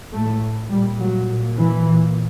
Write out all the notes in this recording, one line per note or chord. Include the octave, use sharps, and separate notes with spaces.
A2 A3
A#2 G3
F#3
A#2
E3
A#2